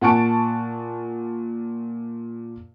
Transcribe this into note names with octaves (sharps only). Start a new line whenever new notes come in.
A#2 F#5 G#5 A5 C#6 D7